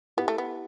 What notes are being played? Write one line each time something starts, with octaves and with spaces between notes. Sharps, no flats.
B3 E4 G4
A3
B3